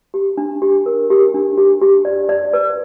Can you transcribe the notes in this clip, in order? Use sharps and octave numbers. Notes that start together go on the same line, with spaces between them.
G4
D4
G4
A#4
G4
D4
G4
G4
D5
D5
B4